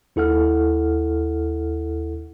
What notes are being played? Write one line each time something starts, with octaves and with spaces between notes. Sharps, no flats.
D#2 E4 A4 F#5 F6